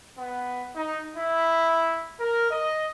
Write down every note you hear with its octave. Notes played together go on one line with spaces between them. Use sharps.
B3
D#4
E4
A#4
D#5